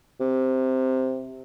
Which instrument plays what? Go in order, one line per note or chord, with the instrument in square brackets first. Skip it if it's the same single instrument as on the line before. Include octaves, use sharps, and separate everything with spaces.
[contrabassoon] C3